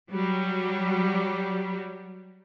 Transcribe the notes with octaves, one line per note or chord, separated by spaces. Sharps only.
F#3 G3